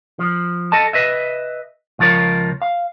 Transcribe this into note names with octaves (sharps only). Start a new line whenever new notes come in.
F3
A4 D#5 A5
B4 D#5 E5
C#2 F3 F4 A#4 C#5
F5